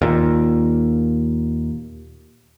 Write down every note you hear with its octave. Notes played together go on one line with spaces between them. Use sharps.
D#2 A#2